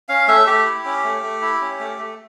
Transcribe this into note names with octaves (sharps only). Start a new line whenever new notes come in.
C#4 F5
A3 E5
A3 G4
E4
C#4
A3
A3
E4
C#4
A3
A3